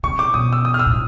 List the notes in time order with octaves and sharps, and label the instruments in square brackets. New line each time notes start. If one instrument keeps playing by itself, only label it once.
[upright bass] C3 [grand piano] C#6
[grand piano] D6
[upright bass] B2 [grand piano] D#6
[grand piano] E6
D#6
F6
E6
[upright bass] A2